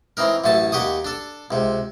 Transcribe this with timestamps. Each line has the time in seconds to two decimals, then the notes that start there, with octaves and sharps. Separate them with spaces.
0.17 E3 C4 D#4 A#4
0.44 A1 F#2 A3 G#5 A5
0.72 D#2 F#4 G4 C#6 D#6
1.05 D4 A4
1.51 C#2 C3